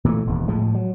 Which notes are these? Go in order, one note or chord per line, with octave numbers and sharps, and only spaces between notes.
A#2 E3 G#3 A3
E1 D#2
A2 F3 G#3
F#3